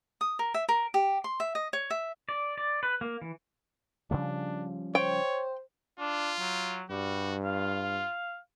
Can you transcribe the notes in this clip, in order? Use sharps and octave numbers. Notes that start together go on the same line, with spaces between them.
D#6
A#4
E5
A#4
G4
C6
E5
D#5
C#5
E5
D5
D5
B4
A#3
E3
C#3 F3 G3 D4
C5 C#5 G5
D4 F4
F#3
G2 G3 F#4
F4 F5